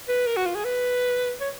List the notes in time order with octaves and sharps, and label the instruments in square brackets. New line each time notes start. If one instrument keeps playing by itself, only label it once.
[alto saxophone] B4
A#4
F#4
F4
G#4
B4
C#5